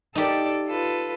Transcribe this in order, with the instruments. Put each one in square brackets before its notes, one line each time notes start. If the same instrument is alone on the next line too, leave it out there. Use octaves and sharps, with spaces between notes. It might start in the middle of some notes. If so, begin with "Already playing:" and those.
[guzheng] D#4 G4 [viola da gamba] A4 D5
[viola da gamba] F4 A4 B4